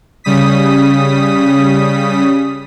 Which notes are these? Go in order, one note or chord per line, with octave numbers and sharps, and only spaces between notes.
C#3 G3 D#6 B6